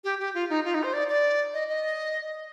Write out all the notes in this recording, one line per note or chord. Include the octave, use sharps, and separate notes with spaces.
G4
G4
F4
D#4
F4
D#4
C5
D5
D5
D#5
D#5